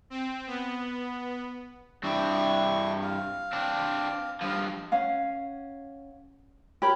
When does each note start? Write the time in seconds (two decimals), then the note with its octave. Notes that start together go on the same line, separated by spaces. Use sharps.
0.10 C4
0.47 B3
2.03 G2 C4 D4 E4 C#6
3.02 F5
3.53 C4 D4
4.41 G2 F3 F5
4.92 C#4 F5 F#5
6.82 G4 A#4 C#5 B5